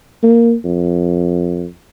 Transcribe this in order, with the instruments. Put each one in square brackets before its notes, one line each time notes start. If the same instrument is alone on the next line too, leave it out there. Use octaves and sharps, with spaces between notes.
[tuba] A#3
F2